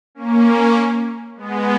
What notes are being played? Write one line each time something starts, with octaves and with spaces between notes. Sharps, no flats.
A#3 C#4
G#3 B3